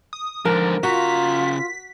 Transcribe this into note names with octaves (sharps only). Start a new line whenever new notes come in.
D#6
G#2 D3 F3 A#4
C#3 F4 F#4 A#5 B6